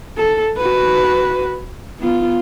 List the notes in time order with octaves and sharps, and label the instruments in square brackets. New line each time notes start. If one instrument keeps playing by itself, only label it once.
[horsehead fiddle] A4
F#4 B4
B3 F4